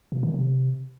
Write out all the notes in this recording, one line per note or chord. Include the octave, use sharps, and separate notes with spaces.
B2
D#3
C3